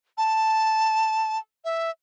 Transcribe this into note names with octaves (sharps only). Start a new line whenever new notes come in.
A5
E5